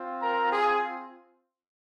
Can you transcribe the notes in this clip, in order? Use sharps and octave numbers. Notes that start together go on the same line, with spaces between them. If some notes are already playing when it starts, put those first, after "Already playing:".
Already playing: C4 F4
A#4 A#5
G#4 G#5